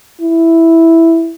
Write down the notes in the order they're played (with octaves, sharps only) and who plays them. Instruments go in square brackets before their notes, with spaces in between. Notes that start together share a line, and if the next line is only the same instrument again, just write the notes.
[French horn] E4